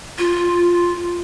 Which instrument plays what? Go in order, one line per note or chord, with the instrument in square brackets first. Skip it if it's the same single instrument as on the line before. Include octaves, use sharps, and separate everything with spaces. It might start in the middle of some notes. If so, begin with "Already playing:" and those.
[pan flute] F4